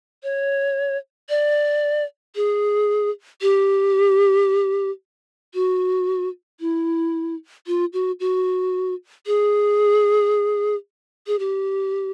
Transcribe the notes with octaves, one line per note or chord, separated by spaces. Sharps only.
C#5
D5
G#4
G4
F#4
E4
F4
F#4
F#4
G#4
G#4
G4